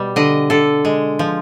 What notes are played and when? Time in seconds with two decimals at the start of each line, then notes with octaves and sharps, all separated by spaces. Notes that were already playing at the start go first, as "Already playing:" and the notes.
Already playing: B2 G3
0.16 D3 D#5
0.50 D3 A4
0.85 G#3
1.19 F3